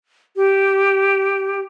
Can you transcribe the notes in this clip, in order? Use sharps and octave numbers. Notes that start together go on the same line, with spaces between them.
G4